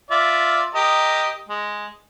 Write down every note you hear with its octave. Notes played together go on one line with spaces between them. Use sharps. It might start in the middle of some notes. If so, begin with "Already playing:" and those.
F4 D5 E5
G4 A#4 D#5
G#3